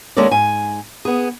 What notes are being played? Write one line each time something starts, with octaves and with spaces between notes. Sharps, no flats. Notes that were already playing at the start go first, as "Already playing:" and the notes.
D#2 G#3 C#4 A4 A#4 D5
G#2 G#5
B3 G#4